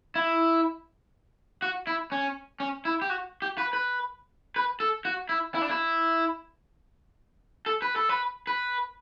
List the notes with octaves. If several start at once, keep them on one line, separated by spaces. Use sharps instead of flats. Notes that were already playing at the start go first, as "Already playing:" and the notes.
E4
F#4
E4
C#4
C#4
E4
G4
F#4
G4
B4
B4
B4
A4
F#4
E4
E4
D4
E4
A4
B4
A4
B4
B4